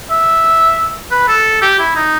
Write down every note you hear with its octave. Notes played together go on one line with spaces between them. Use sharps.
E5
B4
A4
G4
E4
D#4